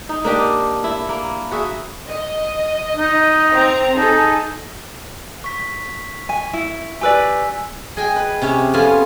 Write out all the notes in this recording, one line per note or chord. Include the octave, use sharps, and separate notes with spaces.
D#4
A#3 D4 G4 D#5
E4
A#3
F#4 G#4 E5
D#5
D#4
C4 A#5
D#4 G#4 A4
C#6 B6
G#5
E4
G4 B4 D5 G#5 E6 B6
G#4 D#5 G5 G#5
B4
C3 C#4 C#5
F2 B3 C#4 F4 F5 G#5